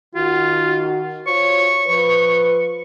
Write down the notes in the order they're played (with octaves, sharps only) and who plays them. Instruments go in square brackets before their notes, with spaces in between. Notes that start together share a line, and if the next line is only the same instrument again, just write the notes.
[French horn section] D#3 F#4 [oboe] F4
[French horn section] F4 C5 C#5 [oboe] C#6
[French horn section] F3 B4